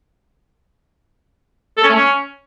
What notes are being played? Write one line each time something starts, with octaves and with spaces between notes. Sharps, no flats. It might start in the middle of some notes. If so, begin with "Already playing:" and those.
A4
C#4
A3
C#4